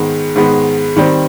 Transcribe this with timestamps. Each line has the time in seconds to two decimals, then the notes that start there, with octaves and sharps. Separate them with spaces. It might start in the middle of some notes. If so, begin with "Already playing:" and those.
Already playing: G#2 D#3 G#3 B3
0.35 G#2 D#3 G#3 B3
0.97 D#3 G3 C4